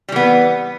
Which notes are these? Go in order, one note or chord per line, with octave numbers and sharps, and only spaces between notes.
E3 G3 B3